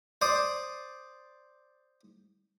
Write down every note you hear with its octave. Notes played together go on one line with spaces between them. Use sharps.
C5 D5 D#6